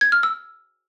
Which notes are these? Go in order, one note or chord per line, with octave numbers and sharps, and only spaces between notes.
G#6
F6
E6